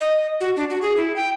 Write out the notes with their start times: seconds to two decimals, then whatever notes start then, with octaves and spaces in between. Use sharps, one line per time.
0.01 D#5
0.40 F#4
0.56 D4
0.70 F#4
0.82 G#4
0.97 E4
1.16 G5